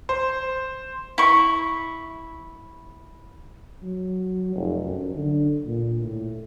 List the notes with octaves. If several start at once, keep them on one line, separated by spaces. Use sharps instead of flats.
C5
E4 C#6
F#3
F1
F#2
D3
A#2
A2